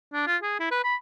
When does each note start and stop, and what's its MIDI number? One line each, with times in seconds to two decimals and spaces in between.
0.13 0.27 62
0.27 0.37 65
0.43 0.58 68
0.60 0.67 64
0.71 0.80 71
0.84 0.95 83